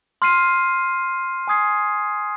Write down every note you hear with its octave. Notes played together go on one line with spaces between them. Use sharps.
C6 F6 C7 D#7
G#5 D#6 G#6 C7